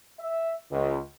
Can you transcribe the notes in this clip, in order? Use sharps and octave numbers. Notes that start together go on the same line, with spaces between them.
E5
C#2